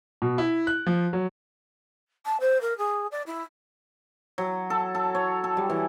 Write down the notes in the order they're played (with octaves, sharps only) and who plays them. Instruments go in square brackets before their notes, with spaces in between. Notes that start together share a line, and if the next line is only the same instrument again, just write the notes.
[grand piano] B2
E4
F#6
F3
F#3
[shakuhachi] A5
C5
A#4
G#4
D5
E4
[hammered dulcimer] F#3
A4
A4
C#5
A4
G3
E3